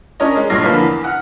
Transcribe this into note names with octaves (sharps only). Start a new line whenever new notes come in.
C#4 D4 A#4 C#5 D#5
G#3
A#1 G2 C#5 F6 A#6 C7
D3 F3 A#3 B4 F6 B6
E2
F#5 F6